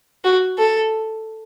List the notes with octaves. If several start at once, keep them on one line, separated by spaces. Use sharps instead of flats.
F#4
A4